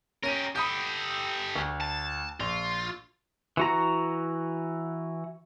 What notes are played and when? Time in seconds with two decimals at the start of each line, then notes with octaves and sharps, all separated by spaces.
0.23 C#4 G4 A#4 D#7
0.56 G4 A4 B5 D#6 G6
1.56 D2
1.81 A5
2.40 A#1 F4
3.57 E3 F#4 A#5